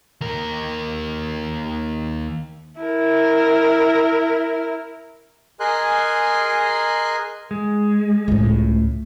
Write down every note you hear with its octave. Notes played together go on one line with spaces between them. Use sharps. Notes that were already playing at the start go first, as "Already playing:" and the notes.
D#2 A#4
E4 A#4
G#4 A#4 D#5 G#5 C6 F#6
G#3
C#2 A2